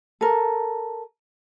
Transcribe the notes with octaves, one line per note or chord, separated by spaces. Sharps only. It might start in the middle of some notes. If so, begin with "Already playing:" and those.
A4 A#4